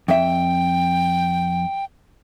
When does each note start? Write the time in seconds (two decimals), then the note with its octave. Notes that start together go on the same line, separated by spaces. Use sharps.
0.08 F2 E5 G5